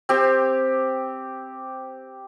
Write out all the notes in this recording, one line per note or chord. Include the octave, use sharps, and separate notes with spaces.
C4 G4